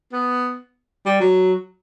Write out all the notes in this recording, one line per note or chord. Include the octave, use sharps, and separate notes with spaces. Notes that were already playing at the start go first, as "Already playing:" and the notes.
B3
G3
F#3